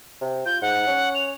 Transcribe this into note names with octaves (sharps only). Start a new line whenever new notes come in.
C3
F4 G6
G#2 F#5
C#4
F7